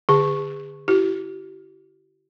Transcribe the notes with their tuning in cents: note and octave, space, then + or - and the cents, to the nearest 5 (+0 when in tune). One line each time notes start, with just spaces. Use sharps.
D3 +0 G#4 -35 A5 +0
E4 +15 G4 -40